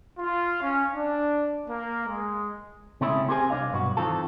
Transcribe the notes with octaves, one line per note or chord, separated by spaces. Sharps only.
F4
C#4
D4
A#3
G#3
C#3 G#3 A3 C4 C#4 E4
C4 G4 G#4 A#4 C5 G#5
C2 D4 C#5 D#5 F5
B1 G2 B3 F#4
D#3 E3 C4 F4 A4